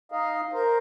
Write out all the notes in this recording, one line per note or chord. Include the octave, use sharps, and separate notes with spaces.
D#4 D#5 F5
A#4 C5